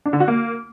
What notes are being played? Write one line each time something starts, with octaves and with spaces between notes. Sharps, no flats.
D4
D3
F#4
A#3